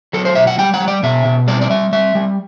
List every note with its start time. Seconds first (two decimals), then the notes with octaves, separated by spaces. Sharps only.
0.13 F#3 A4
0.25 C5
0.35 B2 E5
0.47 F#5
0.58 G3 G5
0.74 F#5
0.80 G3
0.88 D5
1.03 B2 E5
1.25 B2
1.47 G3 D5
1.61 D5
1.70 G3 E5
1.92 G3 E5
2.15 G3